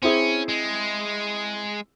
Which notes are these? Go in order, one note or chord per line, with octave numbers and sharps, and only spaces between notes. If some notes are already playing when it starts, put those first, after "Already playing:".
C4 C#4 E4 G#4
G#3